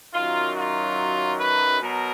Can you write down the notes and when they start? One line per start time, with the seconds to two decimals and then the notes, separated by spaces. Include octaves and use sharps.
0.12 F#2 D#3 F#3 F4
0.55 F4
1.39 B4
1.82 B2 F#3 A#4